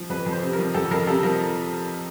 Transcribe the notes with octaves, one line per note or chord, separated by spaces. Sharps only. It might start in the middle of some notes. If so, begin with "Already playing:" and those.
Already playing: F3
F2 B4
F2
C5
C3
A#4
F3
F2 A4
F2 A#4
C3 A4
F3 A#4